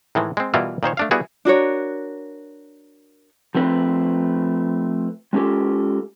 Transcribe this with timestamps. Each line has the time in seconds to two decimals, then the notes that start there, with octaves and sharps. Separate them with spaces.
0.15 A2 D#3 E3 G#3
0.37 G#3 C4
0.54 B2 E3 G3 E4 F4 A#4
0.83 A#2 D#3 C5 C#5
0.97 A3 D4 F5
1.11 G3 B3 E4 F#4 G#4
1.45 D4 F#4 A#4 C#5
3.55 F3 A3 C4 B4
5.33 G#3 C#4 F4 G4 A4